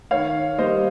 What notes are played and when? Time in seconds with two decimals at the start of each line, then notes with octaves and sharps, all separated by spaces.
0.11 D#3 C#5 F5
0.58 G3 A#3 C5 D#5